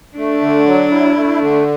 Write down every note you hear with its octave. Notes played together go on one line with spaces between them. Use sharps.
A3 D4
D3
F#3
E4
A3
D3